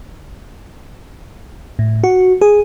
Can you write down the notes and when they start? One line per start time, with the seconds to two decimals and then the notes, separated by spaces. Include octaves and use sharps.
1.79 A2
2.04 F#4
2.41 G#4